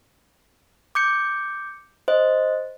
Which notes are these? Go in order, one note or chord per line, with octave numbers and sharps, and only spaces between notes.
D6 G6 C#7
C5 D#5